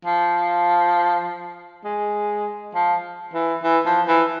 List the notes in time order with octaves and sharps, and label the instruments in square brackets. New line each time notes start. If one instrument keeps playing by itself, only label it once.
[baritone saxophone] F3
G#3
F3
E3
E3
F3
E3